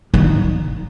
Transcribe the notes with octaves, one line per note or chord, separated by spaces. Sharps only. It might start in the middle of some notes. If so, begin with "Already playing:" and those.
D#3